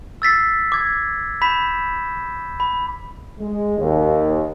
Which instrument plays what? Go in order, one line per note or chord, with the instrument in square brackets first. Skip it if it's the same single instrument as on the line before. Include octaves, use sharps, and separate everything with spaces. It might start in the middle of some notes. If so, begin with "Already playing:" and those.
[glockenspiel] E6 A6 B6 C7
D6 G#6
B5 G6 B6 E7
B5
[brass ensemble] G#3
D#2